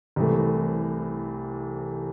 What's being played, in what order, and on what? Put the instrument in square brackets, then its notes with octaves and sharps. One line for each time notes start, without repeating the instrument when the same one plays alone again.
[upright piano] C2 C3 E3 A3